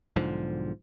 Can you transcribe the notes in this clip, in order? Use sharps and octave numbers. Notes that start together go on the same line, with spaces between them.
B1 G#2 D3 F3